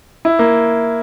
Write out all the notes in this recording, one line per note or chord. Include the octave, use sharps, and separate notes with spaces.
E4
A#3